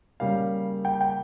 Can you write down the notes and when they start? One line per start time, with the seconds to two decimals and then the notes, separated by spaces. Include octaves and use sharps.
0.20 C#3 G3 A#3 F5
0.85 G5
1.01 G5